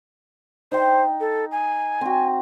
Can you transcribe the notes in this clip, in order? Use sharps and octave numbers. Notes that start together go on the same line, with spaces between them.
D#4 C5 G5
A4
G#5
C4 F#4